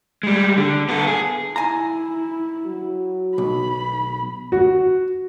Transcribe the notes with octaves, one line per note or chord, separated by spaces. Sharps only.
G3 G#3
D3
B3 A4
G#4
E4 G#5 A#5
F#3 F#4
B1 B5
F#4